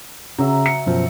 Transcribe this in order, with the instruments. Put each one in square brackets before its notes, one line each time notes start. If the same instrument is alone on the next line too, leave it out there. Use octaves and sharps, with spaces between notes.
[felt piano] C#3 [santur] F#3 E5
[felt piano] C#7
[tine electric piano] F#2 B2 F3